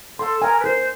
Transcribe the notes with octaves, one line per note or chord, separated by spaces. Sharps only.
A4 C6
A#4 G#5
B4
A#4 C5